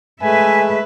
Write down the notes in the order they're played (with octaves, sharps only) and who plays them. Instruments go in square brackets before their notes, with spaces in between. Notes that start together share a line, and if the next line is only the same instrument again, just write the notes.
[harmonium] G#3 A3 [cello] B4 E5 [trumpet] G#5